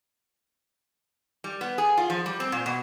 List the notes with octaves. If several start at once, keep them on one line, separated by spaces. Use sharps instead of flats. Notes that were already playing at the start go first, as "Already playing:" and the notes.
G3
B3
G#4
F4
F3
G3
C4
A#2
B2